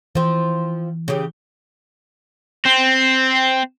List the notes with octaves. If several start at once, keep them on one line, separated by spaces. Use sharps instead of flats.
E3 F3 C4
C#3 G4
C4